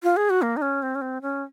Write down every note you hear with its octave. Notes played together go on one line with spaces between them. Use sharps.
F4
G#4
F#4
A#3
D#4
C#4
C4
C#4
C4
C#4